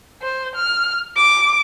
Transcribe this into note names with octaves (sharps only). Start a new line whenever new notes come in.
C5
F6
D6